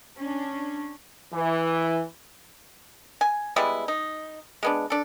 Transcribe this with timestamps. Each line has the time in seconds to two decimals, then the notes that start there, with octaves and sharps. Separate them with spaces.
0.18 C#4 D4
1.33 E3
3.21 G#5
3.56 G3 G#3 B3 E4
3.88 D#4
4.63 G#3 B3 D4
4.90 D4 A4